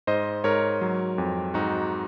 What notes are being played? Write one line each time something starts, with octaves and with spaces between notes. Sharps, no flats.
G#2 C5 D#5
G#2 A#4 C#5
F#3
F2
G#2 D#4 F#4